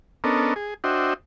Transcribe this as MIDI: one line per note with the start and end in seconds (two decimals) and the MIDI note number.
0.24 0.54 59
0.24 0.54 61
0.24 0.54 62
0.24 0.54 69
0.24 0.54 70
0.24 0.54 75
0.56 0.74 68
0.84 1.14 62
0.84 1.14 66
0.84 1.14 72
0.84 1.14 75
0.84 1.14 76
0.84 1.14 79